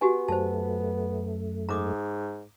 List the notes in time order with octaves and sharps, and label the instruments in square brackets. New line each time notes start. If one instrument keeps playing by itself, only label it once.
[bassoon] B3 [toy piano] F#4 G4 G#5
[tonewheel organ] F#2 A3 [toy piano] C5 A5
[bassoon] G#2 [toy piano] A#5 D6 D#6